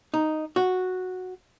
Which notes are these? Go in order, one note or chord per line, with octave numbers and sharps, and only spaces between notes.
D#4
F#4